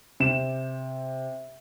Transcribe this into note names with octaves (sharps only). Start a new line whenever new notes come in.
C3 E7